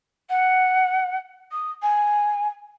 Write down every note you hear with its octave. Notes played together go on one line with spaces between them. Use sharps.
F#5
D#6
G#5